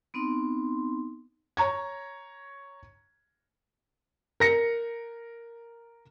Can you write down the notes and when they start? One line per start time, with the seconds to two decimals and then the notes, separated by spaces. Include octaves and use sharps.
0.14 B3 C4 D#4 C6
1.57 C#5 A#5 C#6 G#6
4.40 A#4 A#6 C#7